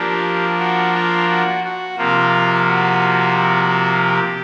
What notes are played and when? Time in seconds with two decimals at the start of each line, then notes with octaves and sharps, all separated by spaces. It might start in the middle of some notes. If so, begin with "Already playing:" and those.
Already playing: F3 A#3 D4 G4
0.59 F#4
0.94 F4
1.29 F#4
1.64 F#4
1.98 C3 F3 A#3 F4
2.68 F#4
4.07 G4